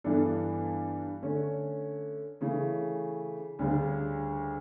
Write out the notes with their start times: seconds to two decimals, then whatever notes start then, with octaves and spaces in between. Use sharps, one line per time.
0.04 G2 E3 B3 D4 A4
1.22 D3 A3 C#4
2.41 C#3 E3 A3
3.59 D2 C#3 G3 D4